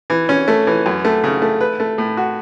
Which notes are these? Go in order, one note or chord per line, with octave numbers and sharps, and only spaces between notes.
E3
C#4
A3
E3
F#2
A3
C#3
A3
B4
A3
A2
F#4